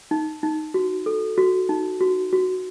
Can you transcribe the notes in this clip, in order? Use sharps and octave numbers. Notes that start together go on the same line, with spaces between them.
D#4
D#4
F#4
A4
F#4
D#4
F#4
F#4